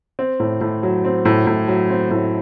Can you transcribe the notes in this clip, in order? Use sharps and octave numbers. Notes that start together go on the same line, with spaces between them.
C4
A2
A2
F#3
C4
A2
A2
F#3
C4
A2